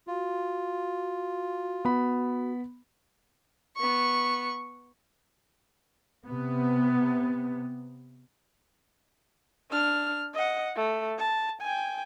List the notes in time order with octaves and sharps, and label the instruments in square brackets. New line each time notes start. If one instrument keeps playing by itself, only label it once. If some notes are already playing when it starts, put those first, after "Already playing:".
[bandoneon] F4 [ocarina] F#4
[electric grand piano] B3 B5
[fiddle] B3 C#6
[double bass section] C3 B3
[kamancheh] D4 F6
D#5 F#5
A3
A5
G5 G#5